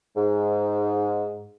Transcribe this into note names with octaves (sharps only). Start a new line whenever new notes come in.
G#2